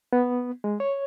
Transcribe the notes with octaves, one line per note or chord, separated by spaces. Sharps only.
B3
G#3
C#5